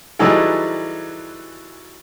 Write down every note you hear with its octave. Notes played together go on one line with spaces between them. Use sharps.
E3 F#3 G3 D#4 G#4 A4